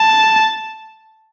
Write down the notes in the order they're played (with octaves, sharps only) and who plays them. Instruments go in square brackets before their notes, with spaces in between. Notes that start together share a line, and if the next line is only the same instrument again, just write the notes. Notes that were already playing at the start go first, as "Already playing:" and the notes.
Already playing: [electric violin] A5